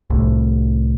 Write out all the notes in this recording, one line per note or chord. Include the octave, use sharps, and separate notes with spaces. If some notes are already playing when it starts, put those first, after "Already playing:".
C2 A2